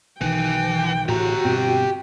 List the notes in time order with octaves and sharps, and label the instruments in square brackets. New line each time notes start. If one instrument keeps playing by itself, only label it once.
[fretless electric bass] B1 D#3 [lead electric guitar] E3 [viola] G5
[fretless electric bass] A1 A2 [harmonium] C#3 [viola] F#4 [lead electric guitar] G4 A#5
[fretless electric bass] G2 B2 C4 [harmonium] G5